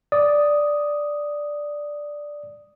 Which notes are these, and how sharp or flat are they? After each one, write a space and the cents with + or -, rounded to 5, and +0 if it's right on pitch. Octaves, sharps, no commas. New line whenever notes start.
D5 +0 D#6 +0